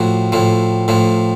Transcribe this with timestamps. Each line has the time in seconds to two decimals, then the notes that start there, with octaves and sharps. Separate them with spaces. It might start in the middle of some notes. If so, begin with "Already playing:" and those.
Already playing: A2 F3 F#4
0.32 A2 F3
0.88 A2 F3